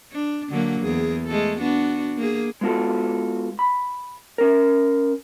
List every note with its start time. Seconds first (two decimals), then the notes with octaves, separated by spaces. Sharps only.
0.12 D4
0.50 D3 F#3 A#3
0.82 E2 G#4
1.28 G#3 A3 A4
1.59 B3 D4 F#4
2.17 A#3 G#4
2.61 G#3 B3 F4 F#4 A4
3.59 B5
4.38 C#4 A#4